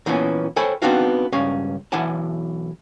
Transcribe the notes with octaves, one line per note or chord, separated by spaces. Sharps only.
A#2 E3 F3 B3 C#4
A4 C5 C#5 G5 G#5 B5
B3 C4 D4 D#4 F#4 F5
C#2 G2 C#4 F5
B1 E3 E4 F#5 G#5 A5